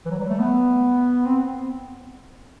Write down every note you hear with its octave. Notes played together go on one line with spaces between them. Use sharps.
E3
F#3
G3
A3
B3
C4